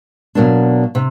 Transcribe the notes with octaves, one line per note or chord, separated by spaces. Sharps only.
B2 F#3 A#3 D4
C3